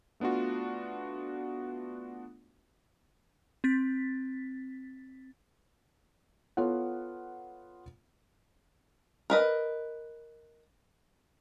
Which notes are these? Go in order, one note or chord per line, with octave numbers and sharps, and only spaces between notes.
A3 B3 D4 F4 F#4
C4 A6 B6
B3 F4 A4 C#5 F#5
A#4 B4 D#5